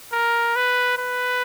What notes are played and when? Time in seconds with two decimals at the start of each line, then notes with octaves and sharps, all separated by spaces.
0.12 A#4
0.56 B4
0.98 B4